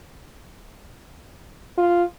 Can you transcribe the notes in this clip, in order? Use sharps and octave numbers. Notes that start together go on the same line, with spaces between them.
F4